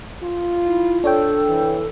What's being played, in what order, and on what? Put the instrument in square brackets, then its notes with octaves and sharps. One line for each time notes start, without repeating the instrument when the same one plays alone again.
[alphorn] F4
[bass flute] E4
[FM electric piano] D4 C#5 G5 [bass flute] A4
[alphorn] E3